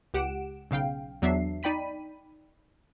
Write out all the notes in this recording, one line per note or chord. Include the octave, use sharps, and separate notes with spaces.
C#2 G4 F#5 D7 E7
B1 C#3 F5 G5
E2 F#3 B3 D4 E5 C7
D#4 D5 G5 B5 B6 D#7